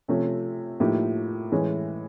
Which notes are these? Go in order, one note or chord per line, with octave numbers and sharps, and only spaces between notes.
C3 F3 A3 C#4
A2 F3 A#3 D#4 G4
A2 E3 G#3 C#4